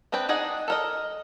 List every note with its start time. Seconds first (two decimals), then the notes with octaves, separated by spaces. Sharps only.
0.12 B3 C4 D4 B4 G5
0.29 D4 D#4 G#4 D#5 F#5
0.68 A4 A#4 D#5